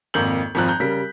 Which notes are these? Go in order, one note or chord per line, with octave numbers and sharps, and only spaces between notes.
G#1 F2 A#3 A#5 G6 F#7
G#1 F2 F3 A#5 F#6
A#5 G6
C#3 G3 A#4 B6